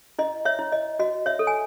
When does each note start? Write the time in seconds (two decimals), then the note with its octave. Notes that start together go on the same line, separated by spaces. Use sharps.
0.19 E4 D#5
0.45 C#5 E5
0.59 E4
0.72 D#5
0.99 F#4 D#5
1.26 C#5 E5
1.39 A4
1.47 G#5